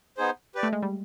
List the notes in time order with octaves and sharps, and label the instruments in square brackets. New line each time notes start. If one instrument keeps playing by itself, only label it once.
[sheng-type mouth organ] B3 D#4 G#4 C5
G4 B4 D5
[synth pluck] A3
G#3
G3